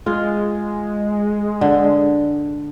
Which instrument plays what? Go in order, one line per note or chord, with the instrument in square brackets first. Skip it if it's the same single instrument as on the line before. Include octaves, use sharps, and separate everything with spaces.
[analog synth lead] G#3 [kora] F4
[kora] D3